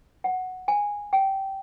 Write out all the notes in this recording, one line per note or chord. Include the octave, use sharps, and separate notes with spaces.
F#5
G#5
G5